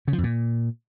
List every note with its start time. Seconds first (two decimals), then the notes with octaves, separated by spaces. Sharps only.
0.08 C#3
0.13 F3
0.18 F2
0.24 A#2